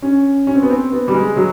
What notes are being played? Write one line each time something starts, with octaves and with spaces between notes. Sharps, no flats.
C#4
C#4
C4
B3
C4
B3
G3
G#3
F#3